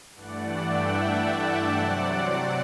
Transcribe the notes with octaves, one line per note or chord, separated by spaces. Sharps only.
G2 E3 A3 D4 D5 F#5
E5 G5
F#5 A5
C3 F#3 C4 D5 F#5